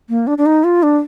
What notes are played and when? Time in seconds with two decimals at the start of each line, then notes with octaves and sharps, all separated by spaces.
0.09 A#3
0.27 D4
0.38 D4
0.46 D#4
0.64 F4
0.83 D4